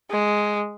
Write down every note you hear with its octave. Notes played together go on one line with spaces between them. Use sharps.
G#3